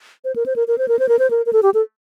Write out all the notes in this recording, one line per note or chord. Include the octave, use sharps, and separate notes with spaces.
C5
A#4
C5
A#4
A#4
C5
A#4
C5
A#4
C5
A#4
A#4
A4
G4
A4